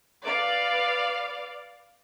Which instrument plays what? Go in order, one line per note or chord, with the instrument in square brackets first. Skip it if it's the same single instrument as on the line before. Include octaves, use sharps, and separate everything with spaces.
[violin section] B4 D5 F5